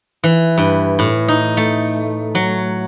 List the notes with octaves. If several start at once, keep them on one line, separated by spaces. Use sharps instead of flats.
E3
G2
A2
D#4
A3
F#3